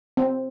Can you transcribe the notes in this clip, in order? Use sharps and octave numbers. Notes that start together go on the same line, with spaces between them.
C4